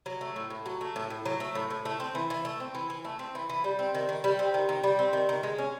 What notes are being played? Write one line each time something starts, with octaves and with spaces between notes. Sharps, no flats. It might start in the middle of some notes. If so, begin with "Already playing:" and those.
F#3
A3
A2
A2
F#3
A3
A2
A2
F#3
A3
A2
A2
A3
C4
E3
E3
A3
C4
E3
E3
A3
C4
E3
E3
G3
C4
D#3
D#3
G3
C4
D#3
D#3
G3
C4
D#3
D#3
G#3
C#4